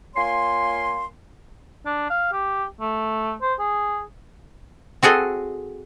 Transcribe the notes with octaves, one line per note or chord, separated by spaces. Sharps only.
A#3 F4 C#5 G#5 C6
D4
F5
G4
A3
C5
G#4
C4 F#4 G#4 A4 D#5